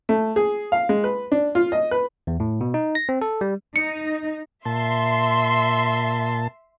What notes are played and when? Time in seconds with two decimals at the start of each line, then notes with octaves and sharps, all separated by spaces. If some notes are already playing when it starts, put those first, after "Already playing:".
0.09 A3
0.36 G#4
0.72 F5
0.89 G#3
1.04 B4
1.32 D4
1.55 F4
1.72 D#5
1.91 B4
2.27 E2
2.40 A2
2.61 B2
2.74 D#4
2.95 A#6
3.09 C4
3.22 A4
3.41 G3
3.76 D#4 C#7
4.66 A#2 E5 A5 C6